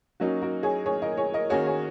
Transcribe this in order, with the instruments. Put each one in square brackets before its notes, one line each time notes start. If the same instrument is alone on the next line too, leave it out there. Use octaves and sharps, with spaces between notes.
[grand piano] F#3 A#3 D#4 [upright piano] C#4 F#4
[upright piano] F#4 A#4
G#4 C#5
G#4 C#5
A#4 D#5
G#4 C#5
A#4 D#5
[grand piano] D#3 A#3 C#4 F#4 [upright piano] G#4 C#5
[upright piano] G#4 C#5